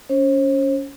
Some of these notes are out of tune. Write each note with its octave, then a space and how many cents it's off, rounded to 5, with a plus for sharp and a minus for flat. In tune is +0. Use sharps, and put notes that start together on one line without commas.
C#4 +20 C5 +45